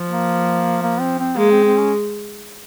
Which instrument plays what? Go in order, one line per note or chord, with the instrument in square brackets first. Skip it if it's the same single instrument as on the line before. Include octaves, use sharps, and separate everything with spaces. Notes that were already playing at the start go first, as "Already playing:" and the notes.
Already playing: [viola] F3
[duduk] A#3
A#3
C4
C4
[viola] G#3 [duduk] A#3
[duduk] C4
C4
C#4